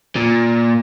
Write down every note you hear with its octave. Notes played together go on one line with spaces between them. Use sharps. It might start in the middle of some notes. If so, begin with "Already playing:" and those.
A#2